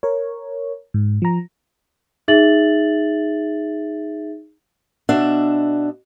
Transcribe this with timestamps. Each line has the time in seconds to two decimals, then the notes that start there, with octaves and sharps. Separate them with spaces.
0.03 A#4 C#5
0.94 G#2
1.22 F3 A#5
2.28 D#4 G#4 E5 A6 F#7
5.09 B2 D4 E5 F#5